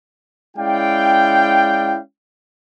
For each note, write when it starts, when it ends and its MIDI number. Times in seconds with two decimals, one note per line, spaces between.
0.57 1.98 56
0.57 1.98 61
0.57 1.98 64
0.57 1.98 74
0.57 1.98 77
0.57 1.98 79